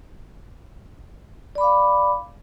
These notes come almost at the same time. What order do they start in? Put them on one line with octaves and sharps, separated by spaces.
D5 B5 D6 F5